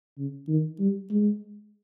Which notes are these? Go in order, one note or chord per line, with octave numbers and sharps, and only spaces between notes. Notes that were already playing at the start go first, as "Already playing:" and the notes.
C#3
D#3
G3
G#3